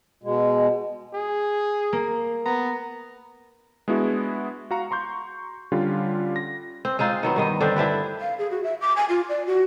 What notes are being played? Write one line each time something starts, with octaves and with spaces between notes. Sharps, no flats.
B2 G#3
G#4
A#3
B3 A#5
G#3 B3 D4 E4 F#4 G#4
F#4 F5 A#5 C#7
A#5 C6 C#6 G6
D3 G3 C#4 F4 G4
A#6
C4
G#3 C4 D#4 F4
D#3 F#3 B3
G2 D#3 D#5
D3 C4 D4 G4
D4 E4 G4 B4
F5
G#4
F#4
E5
D6
G#5
F4
D5
F#4